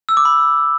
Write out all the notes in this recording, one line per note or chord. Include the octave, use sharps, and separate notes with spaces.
E6
D6
B5